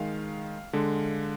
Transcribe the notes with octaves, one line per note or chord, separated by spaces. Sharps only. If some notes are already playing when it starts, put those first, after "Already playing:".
Already playing: D#3 G#3 F5
D3 G#3